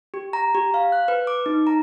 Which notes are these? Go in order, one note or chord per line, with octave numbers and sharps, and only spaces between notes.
G4
A#5
G4
F5
F#6
B4
D6
D#4
A#5